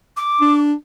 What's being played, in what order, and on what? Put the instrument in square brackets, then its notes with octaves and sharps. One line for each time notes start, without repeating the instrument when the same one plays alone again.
[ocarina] D6
[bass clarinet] D4